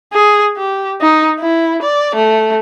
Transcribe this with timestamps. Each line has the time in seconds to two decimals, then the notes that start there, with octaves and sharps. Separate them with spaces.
0.13 G#4
0.58 G4
1.01 D#4
1.40 E4
1.82 D5
2.15 A3